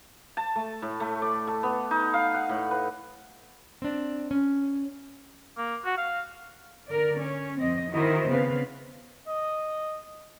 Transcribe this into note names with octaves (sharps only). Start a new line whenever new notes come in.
A5
A3
A2
A3
D5
A4
B3
D#4
F5
F#5
A2
B4
C4 D4
C#4
A#3
F#4
F5
D3 A#4 D5
C#4
F2 C4 D#5
D#3 E4 F#4 A#4 C5 D#5
C#3 B3 C4 B4 F5
D#5